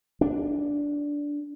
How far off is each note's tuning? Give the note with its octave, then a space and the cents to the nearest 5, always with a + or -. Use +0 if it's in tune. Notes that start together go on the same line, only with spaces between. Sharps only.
D4 -10